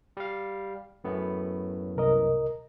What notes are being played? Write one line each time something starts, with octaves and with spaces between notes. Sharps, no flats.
G3 F5
F#2 A2 B3
C2 A#4 D#5